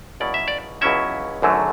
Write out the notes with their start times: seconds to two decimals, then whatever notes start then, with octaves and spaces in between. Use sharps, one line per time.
0.20 C#2 B2 F#3 C#4 E4 D5
0.34 E5
0.48 D5
0.81 C#2 B2 F#3 C#4 E4 E5
1.42 G#1 F#2 D3 F#3 A3